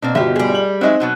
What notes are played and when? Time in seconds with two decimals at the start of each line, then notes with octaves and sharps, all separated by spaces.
0.02 B2 A#3 C4 D4
0.15 G1 B2 F4 G4 E5
0.36 G3 G#4
0.55 F#7
0.81 F#3 G#3 C4 D#4 D#5 E5
1.00 B2 F#3 B3